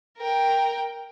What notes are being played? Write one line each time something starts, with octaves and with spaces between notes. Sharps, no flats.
A#4 G5